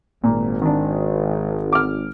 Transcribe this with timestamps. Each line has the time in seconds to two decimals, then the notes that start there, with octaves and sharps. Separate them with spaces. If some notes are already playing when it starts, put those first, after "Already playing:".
0.24 G#1 A#2
0.62 D#3 D4
1.73 D6 F6